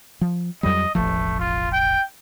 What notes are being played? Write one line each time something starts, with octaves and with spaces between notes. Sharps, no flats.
F3
F2 F#3 G3 D#5
E1 A1 F3 A3
F4
G5